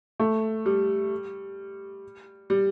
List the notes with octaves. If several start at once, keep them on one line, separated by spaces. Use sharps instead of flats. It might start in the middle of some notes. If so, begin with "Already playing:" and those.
A3
G3
G3